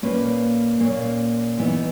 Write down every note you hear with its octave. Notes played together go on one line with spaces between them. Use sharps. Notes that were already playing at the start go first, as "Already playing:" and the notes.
A#2 A#3 C#4 B4
A#2 A#3 C#4
E3 B3 D#4